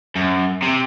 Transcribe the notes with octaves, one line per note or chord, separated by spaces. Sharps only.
F#2
C3